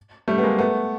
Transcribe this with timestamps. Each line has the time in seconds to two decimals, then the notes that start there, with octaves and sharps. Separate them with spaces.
0.28 G3 A3
0.38 B3
0.43 G#3 A#3
0.58 A3 B3